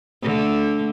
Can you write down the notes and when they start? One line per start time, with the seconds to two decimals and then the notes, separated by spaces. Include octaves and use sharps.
0.22 D3 A3